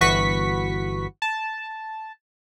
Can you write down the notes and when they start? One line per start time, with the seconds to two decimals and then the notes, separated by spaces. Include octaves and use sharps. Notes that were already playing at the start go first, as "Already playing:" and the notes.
0.01 G1 E3 F#4 B4 C#6 B6
1.22 A5